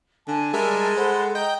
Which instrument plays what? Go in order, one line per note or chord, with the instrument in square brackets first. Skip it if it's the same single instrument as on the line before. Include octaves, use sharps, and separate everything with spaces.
[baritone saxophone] D3 [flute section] G#5 A5
[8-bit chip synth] G3 A#4 E5 [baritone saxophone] G#3
[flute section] A4 F#5 B5 [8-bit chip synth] C5
[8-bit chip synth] D#5 G5 G6 [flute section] A#5